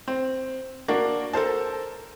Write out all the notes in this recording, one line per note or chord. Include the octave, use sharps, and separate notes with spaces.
C4
A#3 D4 F#4 A#4
A4 A#4 C5 A5